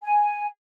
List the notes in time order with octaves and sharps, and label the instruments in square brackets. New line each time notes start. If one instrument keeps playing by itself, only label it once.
[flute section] G#5